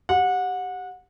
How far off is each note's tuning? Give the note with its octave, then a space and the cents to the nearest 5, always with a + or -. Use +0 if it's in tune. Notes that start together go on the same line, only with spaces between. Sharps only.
G4 +0 F#5 -25